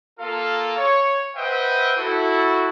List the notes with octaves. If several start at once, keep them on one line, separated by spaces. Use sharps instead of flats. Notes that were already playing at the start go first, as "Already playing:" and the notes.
A#3 F4 A4 A#4 F5
C#5
B4 C5 D#5 E5 F#5 G5
E4 F#4 A4